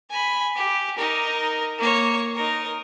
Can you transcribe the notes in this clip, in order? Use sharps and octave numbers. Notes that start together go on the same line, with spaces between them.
G#5 B5
G4
D#4 A#4
A#3 C#5
D#4 A#4